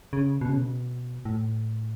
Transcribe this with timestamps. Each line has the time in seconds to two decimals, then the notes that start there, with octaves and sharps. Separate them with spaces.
0.13 C#3
0.41 B2
0.49 C#3
0.58 B2
1.25 A2